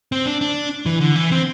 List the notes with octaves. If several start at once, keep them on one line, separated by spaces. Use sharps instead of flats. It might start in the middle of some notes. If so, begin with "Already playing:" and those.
C4
D4
D4
E3
D3
E3
C4